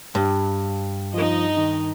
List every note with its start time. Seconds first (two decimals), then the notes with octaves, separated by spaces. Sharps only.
0.15 G2
1.14 F3 D#4 D#5
1.57 D#3